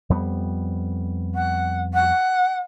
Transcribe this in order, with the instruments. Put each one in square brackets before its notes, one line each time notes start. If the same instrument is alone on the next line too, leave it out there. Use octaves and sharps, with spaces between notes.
[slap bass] F2 G3 B3
[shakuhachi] F#5
F#5